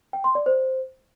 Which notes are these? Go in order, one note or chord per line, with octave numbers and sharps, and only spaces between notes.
G5
C6
D5
C5